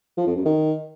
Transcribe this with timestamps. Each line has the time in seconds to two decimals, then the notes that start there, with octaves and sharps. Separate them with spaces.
0.17 F3
0.27 F2
0.36 F#2
0.45 D#3